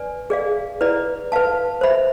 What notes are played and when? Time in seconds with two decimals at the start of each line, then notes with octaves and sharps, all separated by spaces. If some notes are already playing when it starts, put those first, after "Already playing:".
Already playing: B4 D5 G#5
0.30 G#4 D5 F5
0.81 E4 B4 D5
1.32 B4 F5 A5
1.81 C5 E5 B5